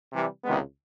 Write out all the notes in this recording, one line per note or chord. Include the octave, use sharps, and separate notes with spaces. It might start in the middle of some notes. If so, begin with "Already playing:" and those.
C3 E3 G3
C#2 C3 D#3 G#3 B3